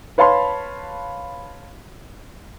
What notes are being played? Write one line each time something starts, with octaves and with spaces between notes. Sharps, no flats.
B4 C#5 F5 A5 B5 C6